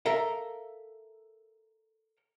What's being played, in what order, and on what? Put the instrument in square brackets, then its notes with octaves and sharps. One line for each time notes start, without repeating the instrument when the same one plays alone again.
[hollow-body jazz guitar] A4 A#4 E5 F5